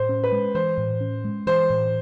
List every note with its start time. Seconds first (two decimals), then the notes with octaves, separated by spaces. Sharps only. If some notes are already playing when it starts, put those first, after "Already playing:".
Already playing: A2 C5
0.09 C#4
0.24 B4
0.32 G#3
0.55 E3 C5
0.78 A2
1.01 C#4
1.24 G#3
1.46 E3 C5
1.70 A2